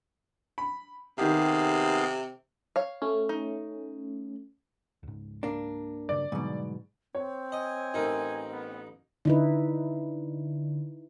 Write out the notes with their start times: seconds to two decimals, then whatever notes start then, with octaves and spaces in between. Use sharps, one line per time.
0.58 B5
1.18 C3 D#3 B3 G4 G#4 F5
2.76 C#5 F5
3.02 A3 C#4
3.29 D#4
5.03 C#2 G#2
5.43 A#3 D4
6.09 G2 C#3 D5
6.32 G#2 B2 D3 F#3 G3
7.15 C4 C#5
7.52 D#5 G#5
7.94 A1 D#4 A#4
8.51 B3
9.25 D3 D#4 E4 B4